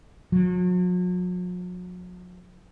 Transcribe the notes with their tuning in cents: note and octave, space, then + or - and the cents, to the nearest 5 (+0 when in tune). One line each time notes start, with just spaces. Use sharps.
F#3 -45